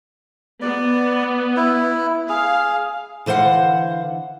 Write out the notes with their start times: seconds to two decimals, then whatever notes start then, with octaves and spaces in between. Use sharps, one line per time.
0.62 B3 D5
1.57 E4
2.29 G#4 F5
3.26 D3 E3 C5 F5 F#5